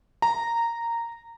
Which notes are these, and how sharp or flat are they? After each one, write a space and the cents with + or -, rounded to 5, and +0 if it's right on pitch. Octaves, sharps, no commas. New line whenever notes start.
A#5 -10